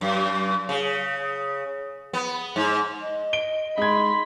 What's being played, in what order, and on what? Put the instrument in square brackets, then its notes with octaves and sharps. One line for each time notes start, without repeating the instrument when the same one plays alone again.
[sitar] F#2
C#3
B3
G#2
[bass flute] D#5
[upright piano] D7 G7
[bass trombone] G#3 [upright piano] D#4 G#6 [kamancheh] B5 C6